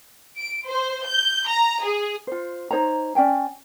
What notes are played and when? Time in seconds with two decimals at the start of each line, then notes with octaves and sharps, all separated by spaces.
0.37 D7
0.67 C5
1.04 G6
1.46 A#5
1.83 G#4
2.27 F4 C5
2.71 D#4 C5 C#5 A#5
3.15 C#4 D5 G5 G#5